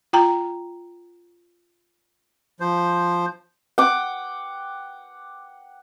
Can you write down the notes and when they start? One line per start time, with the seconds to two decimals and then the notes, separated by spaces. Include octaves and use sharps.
0.13 F4 G5 A#5
2.60 F3 C5
3.78 F#5 G5 D6